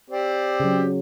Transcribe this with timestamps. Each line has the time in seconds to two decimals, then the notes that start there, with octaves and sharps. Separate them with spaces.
0.10 C4 G4 D5
0.60 C#3 F#3